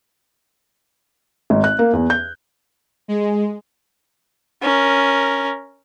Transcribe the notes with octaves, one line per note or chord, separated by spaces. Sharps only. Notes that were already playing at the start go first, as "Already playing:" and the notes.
G#1
F#6
A#3
E2
G6
G#3
C#4 A#4